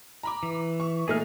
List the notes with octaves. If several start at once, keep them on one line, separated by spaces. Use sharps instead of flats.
A#5 B5 D6
E3
C#6
A#2 A3 D#4 G#4 F6